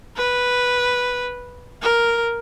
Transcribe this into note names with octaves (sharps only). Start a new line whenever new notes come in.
B4
A#4